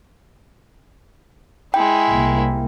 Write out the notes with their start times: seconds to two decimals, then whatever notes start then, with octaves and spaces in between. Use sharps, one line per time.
1.74 G#3 E4 G5
2.09 C2 A#3